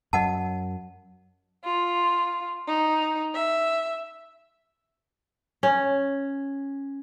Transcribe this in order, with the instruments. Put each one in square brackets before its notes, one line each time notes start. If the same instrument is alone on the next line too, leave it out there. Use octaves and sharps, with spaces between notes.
[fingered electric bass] F#2 F#3 [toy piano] D#5 F#5 A5
[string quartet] F4
D#4
E5
[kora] C#4